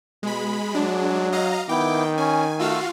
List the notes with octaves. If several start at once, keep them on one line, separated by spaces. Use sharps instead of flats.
B2 G#3 B5
F#3 G#3 D4
D#5 F5 A#5
D#3 B3 E4 G5 D6
C#4 G#5
A3 F4 F#4 F5 E6